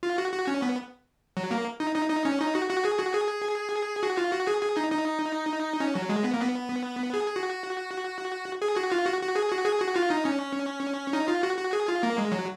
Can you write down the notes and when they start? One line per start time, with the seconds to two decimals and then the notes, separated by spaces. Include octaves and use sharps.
0.03 F4
0.18 F#4
0.32 F#4
0.47 C#4
0.62 B3
1.37 F#3
1.51 A#3
1.80 D#4
1.95 D#4
2.10 D#4
2.25 C#4
2.40 D#4
2.55 F#4
2.70 F#4
2.85 G#4
2.99 F#4
3.14 G#4
4.03 F#4
4.17 F4
4.33 F#4
4.47 G#4
4.62 G#4
4.77 D#4
4.91 D#4
5.80 C#4
5.95 F#3
6.09 G#3
6.24 B3
6.34 A#3
6.42 B3
7.14 G#4
7.36 F#4
8.62 G#4
8.76 F#4
8.92 F4
9.06 F#4
9.21 F#4
9.36 G#4
9.51 F#4
9.65 G#4
9.81 F#4
9.96 F4
10.10 D#4
10.25 C#4
11.13 D#4
11.28 F4
11.43 F#4
11.58 F#4
11.73 G#4
11.88 F4
12.03 A#3
12.18 G#3
12.32 F#3